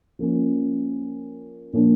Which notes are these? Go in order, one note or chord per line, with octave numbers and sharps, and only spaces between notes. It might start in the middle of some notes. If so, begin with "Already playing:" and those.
F3 A#3 C#4
A#2 F3 A#3 D4